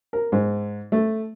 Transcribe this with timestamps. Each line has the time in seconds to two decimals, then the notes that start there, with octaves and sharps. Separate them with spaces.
0.13 A#4
0.32 G#2
0.92 A3